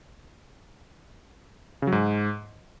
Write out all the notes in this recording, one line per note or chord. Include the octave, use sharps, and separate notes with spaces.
C#3
F#3
G#2